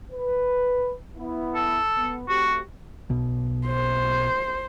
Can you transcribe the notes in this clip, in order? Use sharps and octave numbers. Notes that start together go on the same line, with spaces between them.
B4
B3 E4
A4
B3
A3 C4 F#4 G4
B1 B2
C5